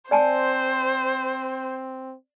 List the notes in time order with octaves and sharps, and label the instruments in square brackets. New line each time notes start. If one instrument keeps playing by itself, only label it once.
[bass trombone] C4 [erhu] C5 [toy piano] D5 G#5 A5